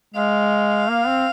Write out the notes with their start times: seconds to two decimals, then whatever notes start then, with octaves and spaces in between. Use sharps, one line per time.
0.14 G#3 F5
0.89 A#3
1.08 C4